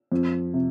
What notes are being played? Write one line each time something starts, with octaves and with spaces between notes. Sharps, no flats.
F2
C3